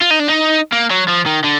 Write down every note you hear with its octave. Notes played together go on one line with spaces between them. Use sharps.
F4
D#4
D4
D#4
A#3
F#3
F3
D#3
D3